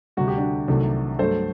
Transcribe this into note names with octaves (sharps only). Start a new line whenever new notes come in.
D2 C3 G3 F#4
G4
D4 F#4
C2 C3 D#3 F#3 A3
G2 F#3 A3 A4 C5